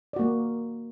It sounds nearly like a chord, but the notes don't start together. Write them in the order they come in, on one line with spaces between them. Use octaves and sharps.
D5 F#4 A#3